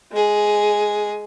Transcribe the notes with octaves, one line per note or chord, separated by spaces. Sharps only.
G#3 G#4